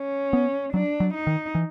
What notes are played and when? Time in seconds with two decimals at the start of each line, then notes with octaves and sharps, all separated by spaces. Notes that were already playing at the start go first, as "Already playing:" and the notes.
Already playing: C#4
0.33 B3
0.73 F#3 D4
1.00 F#3
1.14 D#4
1.27 D#3
1.55 E3